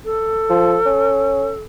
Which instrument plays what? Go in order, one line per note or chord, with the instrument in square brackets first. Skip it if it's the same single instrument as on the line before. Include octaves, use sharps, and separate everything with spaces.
[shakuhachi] A4
[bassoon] F3
C#4